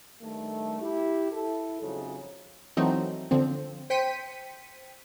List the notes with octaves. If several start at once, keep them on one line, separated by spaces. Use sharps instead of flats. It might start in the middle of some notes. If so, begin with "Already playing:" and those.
G2 D#3 A3
E4 G4
E4 A4
F2 G#2 C#3 F3 F#3
E3 F#3 A3 C4 D#4
D3 F3 C4
C5 G5 B6 C#7 D#7